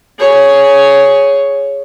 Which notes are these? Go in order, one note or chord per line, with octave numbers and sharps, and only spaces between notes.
G#4 C#5